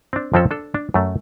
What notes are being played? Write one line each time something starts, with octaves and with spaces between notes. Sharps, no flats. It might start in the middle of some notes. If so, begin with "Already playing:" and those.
C4 D4
F2 F3 C4 C#4 A4
D4 A4
D4
F#2 F#3 A3